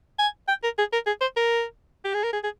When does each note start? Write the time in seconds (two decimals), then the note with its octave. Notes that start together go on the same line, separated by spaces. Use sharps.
0.19 G#5
0.48 G5
0.63 A#4
0.78 G#4
0.92 A#4
1.06 G#4
1.21 C5
1.36 A#4
2.04 G4
2.14 G#4
2.23 A#4
2.33 G#4
2.43 G#4